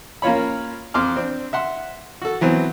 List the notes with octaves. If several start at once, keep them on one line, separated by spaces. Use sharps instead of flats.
A#3 C#4 F4 C#5 B5
F2 C6 D6 F6
C4 D4
E5 F#5 C6
F#4 A4
E3 F#3 B3 C4